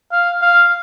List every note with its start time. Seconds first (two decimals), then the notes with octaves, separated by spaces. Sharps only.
0.12 F5
0.42 F5